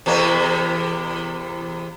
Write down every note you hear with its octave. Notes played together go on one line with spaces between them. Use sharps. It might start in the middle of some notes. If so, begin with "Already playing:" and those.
E2 C3 A#3